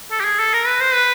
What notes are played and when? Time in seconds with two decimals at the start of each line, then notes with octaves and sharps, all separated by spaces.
0.11 A4
0.20 G4
0.25 G#4
0.39 A4
0.54 A#4
0.67 B4
0.81 C5
0.94 B4